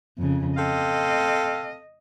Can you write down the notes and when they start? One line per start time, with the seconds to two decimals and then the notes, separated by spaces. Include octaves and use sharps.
0.18 F2 C#3
0.57 C4 A4 D#5 F5